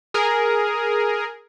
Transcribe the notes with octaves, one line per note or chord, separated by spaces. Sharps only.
G#4 A#4